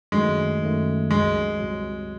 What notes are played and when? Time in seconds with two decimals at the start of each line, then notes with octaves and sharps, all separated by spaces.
0.12 F#2 D#3 F#3 G#3 A3
0.62 F#2 D#3 F#3 A3
1.11 C2 C3 F#3 G#3
1.60 C2 C3 F#3